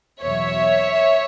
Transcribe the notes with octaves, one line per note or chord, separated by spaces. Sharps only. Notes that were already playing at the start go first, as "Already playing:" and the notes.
E2 B2 F#3 C#5 E5